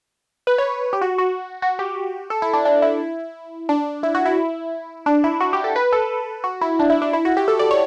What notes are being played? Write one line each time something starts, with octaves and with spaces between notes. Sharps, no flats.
B4
C#5
G4
F#4
F#4
F#4
G4
A4
E4
D4
D4
E4
D4
E4
F#4
E4
D4
E4
F#4
G4
A4
B4
A4
F#4
E4
D4
E4
D4
E4
F#4
G4
A4
D5
C#5